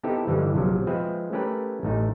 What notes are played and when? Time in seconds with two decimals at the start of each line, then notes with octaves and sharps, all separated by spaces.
0.03 B3 C4 D#4 E4 G4 A4
0.27 G2 D3 E3 F3 G3 G#3
0.54 A#1 C3 F3 F#3
0.87 F3 G#3 C4 G#4 B4 E5
1.32 A3 C#4 G4 A#4 B4
1.83 A1 A3 D#4